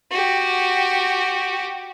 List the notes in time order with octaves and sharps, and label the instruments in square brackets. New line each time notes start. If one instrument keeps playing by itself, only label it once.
[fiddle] F#4 G4